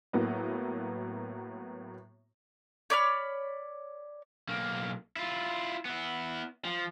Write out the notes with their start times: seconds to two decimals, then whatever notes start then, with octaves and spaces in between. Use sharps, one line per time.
0.13 A2 F#3 A#3 B3
2.90 C#5 D5 B5 F6
4.49 B1 A#3
5.16 E4 F4
5.85 B3 E4
6.65 F3